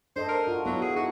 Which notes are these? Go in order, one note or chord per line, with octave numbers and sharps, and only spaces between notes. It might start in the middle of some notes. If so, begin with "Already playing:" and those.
D4 A4 C5 D#5
A#4
F4 F#4
F#3 B3 E4
G#4
D#4 E4 F#4 G#4